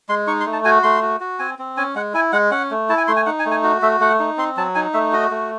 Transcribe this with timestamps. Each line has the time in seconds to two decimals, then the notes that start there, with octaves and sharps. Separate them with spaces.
0.09 G#3 C6
0.27 D#4 C#6
0.40 C6
0.46 A3
0.53 A5
0.65 F#4 G#5
0.83 A3 C6
1.02 F#4
1.21 F#4
1.39 C4 G#5
1.59 C4
1.77 C#4 G#5
1.95 G#3 F#5
2.14 E4 G#5
2.32 G#3 F#5
2.51 C#4 F#5
2.71 A3
2.89 E4 A5
2.98 G#5
3.07 A3 C6
3.16 G#5
3.26 D#4 F#5
3.39 G#5
3.45 A3
3.51 G#5
3.64 F#4
3.82 A3 E5
4.00 A3 F#5
4.20 D#4
4.38 C4 C6
4.57 F#3 A5
4.75 D#4 G#5
4.94 A3 E5
5.13 F#4 D#5
5.31 A3